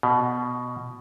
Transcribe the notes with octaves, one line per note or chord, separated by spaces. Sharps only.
B2